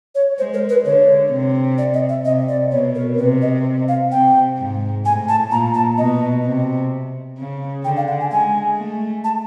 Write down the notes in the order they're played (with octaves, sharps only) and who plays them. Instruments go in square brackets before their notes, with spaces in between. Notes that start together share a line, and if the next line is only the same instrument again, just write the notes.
[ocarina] C#5
[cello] G#3 [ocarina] C5
[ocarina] A#4
B4
[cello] D3 [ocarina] C#5
[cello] C3
[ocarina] D5
D#5
E5
[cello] C3 [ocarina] D#5
[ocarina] D5
[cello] B2 [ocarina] C#5
[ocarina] A#4
[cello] C3 [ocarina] B4
[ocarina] D#5
F5
[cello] C3 [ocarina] G5
[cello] G#2
[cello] A2 [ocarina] G#5
[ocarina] A5
[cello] A#2 [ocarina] A#5
[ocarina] A5
[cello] B2 [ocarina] D#5
[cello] C3
C#3
[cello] D3 [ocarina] G5
[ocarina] F5
F#5
G#5
[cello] G#3 [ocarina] G#5
[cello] A3
[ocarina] A5